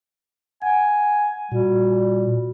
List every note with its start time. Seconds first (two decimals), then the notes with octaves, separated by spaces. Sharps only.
0.62 F#5 G#5
1.52 A#2 G3 F#4